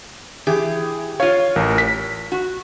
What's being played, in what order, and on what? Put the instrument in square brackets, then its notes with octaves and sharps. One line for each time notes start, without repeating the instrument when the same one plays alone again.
[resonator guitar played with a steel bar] E3 G4 [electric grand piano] G#4
[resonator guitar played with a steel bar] F4 F5 [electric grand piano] C#5
[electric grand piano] A1 A#4
B6
[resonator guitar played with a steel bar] F#4